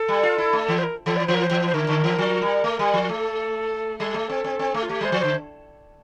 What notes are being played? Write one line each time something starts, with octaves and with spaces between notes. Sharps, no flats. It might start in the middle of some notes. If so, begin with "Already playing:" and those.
Already playing: A4
G3
F4
E4
A3
E3
C5
A#4
E3 A4
D5
E3 C5
A#4
C5
E3
C5
D3 A#4
D3
E3
F3
G3
A3
G3
F3
A3 A4
G3 A4
A3
C4
C4
C4
A3
F4
A3 G4
G3 C5
F3
D3 C5